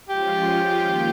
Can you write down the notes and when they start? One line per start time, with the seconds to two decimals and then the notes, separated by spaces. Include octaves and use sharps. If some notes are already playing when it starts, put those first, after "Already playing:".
0.09 F3 G#3 C#4 F4 G4
0.80 D#3 A#3 F4